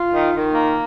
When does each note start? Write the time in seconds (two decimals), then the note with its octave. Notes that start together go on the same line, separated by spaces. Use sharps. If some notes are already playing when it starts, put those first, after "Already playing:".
Already playing: F4
0.14 D#3
0.35 D#3
0.54 A#3